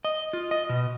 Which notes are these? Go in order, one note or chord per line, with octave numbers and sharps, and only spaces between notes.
D#5
F4
D#5
B2